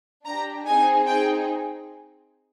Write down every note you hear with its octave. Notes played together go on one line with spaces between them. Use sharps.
D4 G4 A#5
C4 D#4 G#4 G#5
C4 D#4 G#4 G5